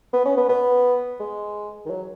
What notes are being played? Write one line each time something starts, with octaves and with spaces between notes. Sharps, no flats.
B3
C#4
B3
B3
G#3
D#3
F#3